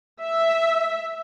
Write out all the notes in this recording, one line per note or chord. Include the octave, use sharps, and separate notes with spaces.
E5